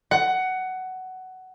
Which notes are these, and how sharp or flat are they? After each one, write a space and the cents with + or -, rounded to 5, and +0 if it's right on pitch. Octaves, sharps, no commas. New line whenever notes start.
F#5 +15